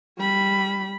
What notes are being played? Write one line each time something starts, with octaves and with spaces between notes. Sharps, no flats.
G3 B5